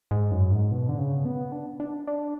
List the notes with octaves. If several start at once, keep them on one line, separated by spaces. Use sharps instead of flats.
G#2
F#2
G#2
B2
D3
C#3
B3
D4
D4
D4